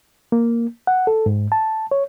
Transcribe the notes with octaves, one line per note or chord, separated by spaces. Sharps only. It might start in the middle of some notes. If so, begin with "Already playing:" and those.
A#3
F#5
A4
G#2
A5
C#5